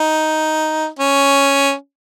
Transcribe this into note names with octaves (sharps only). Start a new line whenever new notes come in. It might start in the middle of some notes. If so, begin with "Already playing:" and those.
Already playing: D#4
C#4